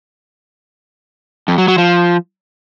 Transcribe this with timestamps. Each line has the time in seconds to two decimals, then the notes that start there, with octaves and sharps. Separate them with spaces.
1.48 F2
1.58 F#3
1.68 F#3
1.78 F3